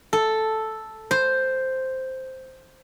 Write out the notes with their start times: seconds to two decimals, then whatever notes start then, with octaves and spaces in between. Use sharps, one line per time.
0.13 A4
1.11 C5